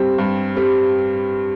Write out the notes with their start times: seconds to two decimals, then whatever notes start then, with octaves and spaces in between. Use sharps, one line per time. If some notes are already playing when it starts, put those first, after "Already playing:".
Already playing: G2 G3 C4
0.18 G2
0.56 G3 C4